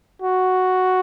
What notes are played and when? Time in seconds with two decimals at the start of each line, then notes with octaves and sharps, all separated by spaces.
0.22 F#4